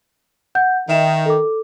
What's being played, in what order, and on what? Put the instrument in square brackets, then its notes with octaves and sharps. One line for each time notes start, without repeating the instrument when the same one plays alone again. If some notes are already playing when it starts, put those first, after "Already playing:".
[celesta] F#5 G6
[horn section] D#3 [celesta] E5 E7
[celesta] A4 D6